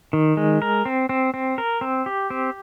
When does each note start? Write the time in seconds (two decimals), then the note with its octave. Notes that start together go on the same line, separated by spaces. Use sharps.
0.13 D#3
0.37 G#3
0.62 A#4
0.85 C4
1.09 C4
1.34 C4
1.58 A#4
1.81 C4
2.06 G4
2.30 C4